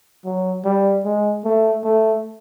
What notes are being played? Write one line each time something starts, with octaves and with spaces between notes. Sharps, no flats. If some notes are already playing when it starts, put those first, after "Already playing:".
F#3
G3
G#3
A3
A3